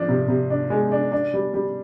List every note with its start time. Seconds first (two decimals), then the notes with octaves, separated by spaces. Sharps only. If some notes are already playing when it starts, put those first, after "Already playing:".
Already playing: F3 D4
0.09 C3
0.28 C3
0.50 D4
0.70 G#3
0.92 D4
1.12 D4
1.34 G3
1.54 G3